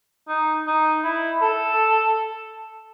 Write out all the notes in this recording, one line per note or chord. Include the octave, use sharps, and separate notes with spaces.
D#4
D#4
E4
A4